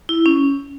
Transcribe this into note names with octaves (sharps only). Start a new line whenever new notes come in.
E4
C#4